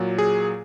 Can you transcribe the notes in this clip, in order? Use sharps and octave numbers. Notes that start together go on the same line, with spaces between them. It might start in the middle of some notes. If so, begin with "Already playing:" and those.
Already playing: A#2 F#3
G#4